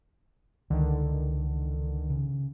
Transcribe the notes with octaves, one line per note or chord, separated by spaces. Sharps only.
C#2 D3 D#3
C#3